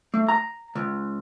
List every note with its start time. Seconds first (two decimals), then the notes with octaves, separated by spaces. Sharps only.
0.14 A3
0.28 A#5
0.75 C#2